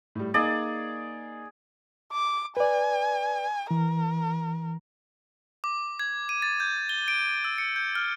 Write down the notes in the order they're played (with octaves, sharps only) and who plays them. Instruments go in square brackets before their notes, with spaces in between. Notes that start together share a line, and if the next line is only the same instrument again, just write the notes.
[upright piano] A2 G3
[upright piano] A#3 D#4 [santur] G#4 D5
[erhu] D6
[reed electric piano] B4 D5 [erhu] G#5
[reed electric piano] E3 [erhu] A#4
[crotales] D6
G#6
D#7
A6
G6
G7
D7
E6
C#7
G6
F6